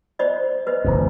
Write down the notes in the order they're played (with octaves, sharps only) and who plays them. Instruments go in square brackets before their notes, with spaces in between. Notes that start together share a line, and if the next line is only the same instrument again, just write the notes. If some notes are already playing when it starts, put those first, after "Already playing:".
[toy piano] C5 D5 D#5
B4 C5 D#5
[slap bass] D1 A1 F#2